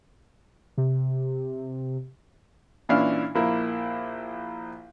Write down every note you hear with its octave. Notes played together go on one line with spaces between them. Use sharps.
C3
A#2 E3 C#4 D4 E4 F5
A#1 A#3 E4